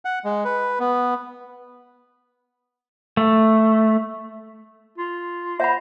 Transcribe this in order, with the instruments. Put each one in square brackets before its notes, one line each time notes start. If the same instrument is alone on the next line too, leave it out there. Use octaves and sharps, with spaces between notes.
[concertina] F#5
G#3
B4
B3
[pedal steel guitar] A3
[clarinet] F4
[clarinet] C5 [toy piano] E5 F#5 B5